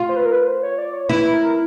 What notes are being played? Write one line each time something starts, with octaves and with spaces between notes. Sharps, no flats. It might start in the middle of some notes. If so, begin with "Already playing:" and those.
Already playing: F4
C5
B4
A#4
B4
C5
C#5
D5
C#5
E4 B4
A#4